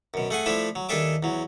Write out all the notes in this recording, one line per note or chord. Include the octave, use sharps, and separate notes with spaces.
F#2 B2
A3 G#4 F#5 G#5
F3 A3 D4 E4 E5
F#3
D#2 D4 G#4 A4 E5 D6
E2 F#3